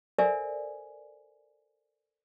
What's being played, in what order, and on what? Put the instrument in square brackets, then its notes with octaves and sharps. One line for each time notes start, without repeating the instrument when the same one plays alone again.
[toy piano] A4 A#4 C5 D5 E5 G#5